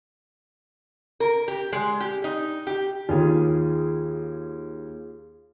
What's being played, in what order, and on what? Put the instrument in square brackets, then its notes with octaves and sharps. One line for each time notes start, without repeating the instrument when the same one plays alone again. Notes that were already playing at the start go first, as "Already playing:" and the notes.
[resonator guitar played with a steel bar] A#4
G4
G#3
G4
D#4
G4
[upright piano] D#2 [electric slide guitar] F4 G#4